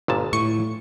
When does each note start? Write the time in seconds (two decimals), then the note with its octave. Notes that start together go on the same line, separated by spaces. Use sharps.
0.08 G1 A#2 A5
0.33 A2 C#6